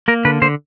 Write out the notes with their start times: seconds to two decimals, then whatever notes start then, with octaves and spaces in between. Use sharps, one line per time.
0.08 A#3 A#4
0.25 D3 B4
0.42 D3 C5